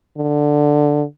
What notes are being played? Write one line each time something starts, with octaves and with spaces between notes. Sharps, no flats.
D3